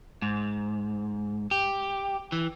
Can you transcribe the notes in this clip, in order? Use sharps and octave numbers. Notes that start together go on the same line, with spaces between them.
G#2
G4
E3